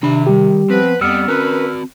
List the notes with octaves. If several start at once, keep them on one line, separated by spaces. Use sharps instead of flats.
C3 D#3 D4 B5
G3 G4
F3 B3 C4 B4
F2 G3 B3 E6 F6 C#7
C4 C#4 F#4 A#4 B4